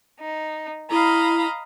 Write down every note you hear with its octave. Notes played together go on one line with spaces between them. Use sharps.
D#4
E4 D#5 F5 A#5 B5